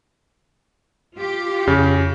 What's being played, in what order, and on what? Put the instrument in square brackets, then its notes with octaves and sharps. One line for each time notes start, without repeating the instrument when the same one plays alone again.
[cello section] F4 G4
[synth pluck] F2 [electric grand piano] C#3